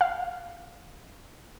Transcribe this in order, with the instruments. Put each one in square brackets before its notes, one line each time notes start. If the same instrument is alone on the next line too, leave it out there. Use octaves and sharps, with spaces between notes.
[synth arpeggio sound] F5